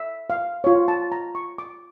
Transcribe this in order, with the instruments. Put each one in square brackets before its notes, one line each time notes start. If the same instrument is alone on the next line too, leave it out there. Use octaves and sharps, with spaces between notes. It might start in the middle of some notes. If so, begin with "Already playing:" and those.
Already playing: [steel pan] E5
F5
F4 C#5
A5
A#5
C#6
D6